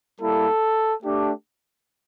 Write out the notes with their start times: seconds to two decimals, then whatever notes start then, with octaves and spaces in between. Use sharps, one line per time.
0.19 G3 A#3 E4 A4
1.02 A3 D4 G4